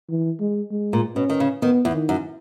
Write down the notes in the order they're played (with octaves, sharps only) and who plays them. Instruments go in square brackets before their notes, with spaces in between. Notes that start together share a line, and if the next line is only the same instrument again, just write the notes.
[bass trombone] E3
G#3
G#3
[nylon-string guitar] A#2
[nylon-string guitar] B2 [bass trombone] C#4
[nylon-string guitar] D#3
C#3
[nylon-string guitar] D#3 [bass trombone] B3
[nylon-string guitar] E2
[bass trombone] D#3
[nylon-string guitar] F#2